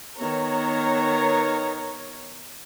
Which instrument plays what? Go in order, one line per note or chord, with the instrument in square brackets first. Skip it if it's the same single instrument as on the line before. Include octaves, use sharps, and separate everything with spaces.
[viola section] D#3 B3 C#5 A#5